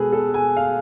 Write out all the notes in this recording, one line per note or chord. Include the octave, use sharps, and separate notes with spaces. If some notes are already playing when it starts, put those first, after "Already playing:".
Already playing: B2 G#3 G#4 A4 B4
A4
G#5
F5